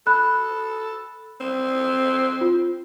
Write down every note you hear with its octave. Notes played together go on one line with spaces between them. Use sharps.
A4 B5 F#6
C4
F4